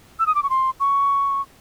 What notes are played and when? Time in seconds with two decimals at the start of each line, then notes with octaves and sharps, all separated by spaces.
0.19 E6
0.27 D#6
0.35 D6
0.43 C#6
0.50 C6
0.80 C#6